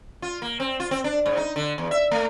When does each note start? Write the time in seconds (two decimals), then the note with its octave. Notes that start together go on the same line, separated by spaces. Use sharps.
0.22 F4
0.42 A#3
0.60 C4
0.80 F4
0.91 C4
1.04 D4
1.26 G#2
1.37 D#4
1.56 D3
1.78 E2
1.91 E5
2.11 A3